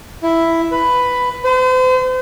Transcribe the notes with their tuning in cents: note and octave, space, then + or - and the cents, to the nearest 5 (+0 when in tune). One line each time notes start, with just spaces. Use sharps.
E4 +5
B4 +10
C5 -40